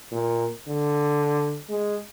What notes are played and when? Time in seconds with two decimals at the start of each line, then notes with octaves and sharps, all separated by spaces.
0.12 A#2
0.68 D3
1.69 G#3